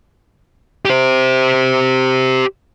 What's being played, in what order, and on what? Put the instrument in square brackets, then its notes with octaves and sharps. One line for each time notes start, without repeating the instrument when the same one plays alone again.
[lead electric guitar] G4 C5